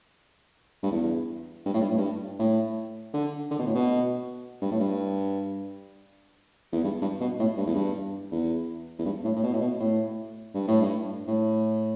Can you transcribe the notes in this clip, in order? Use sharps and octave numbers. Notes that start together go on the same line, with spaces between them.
G2
E2
G2
A2
G2
A2
G2
A2
D3
D3
B2
A2
B2
G2
A2
G2
E2
G2
G2
B2
A2
G2
E2
G2
E2
E2
G2
A2
A2
B2
A2
B2
A2
G2
A2
G2
A2